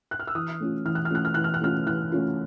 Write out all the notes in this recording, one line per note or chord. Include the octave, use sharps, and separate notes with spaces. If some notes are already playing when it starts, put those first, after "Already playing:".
F#6
F6
E6
E3 D#6
A3 C#4 F4
E3 F6
F#6
F6
A3 C#4 F4 F#6
F6
E3 F#6
F6
F#6
A3 C#4 F4 F6
E3 F#6
A3 C#4 F4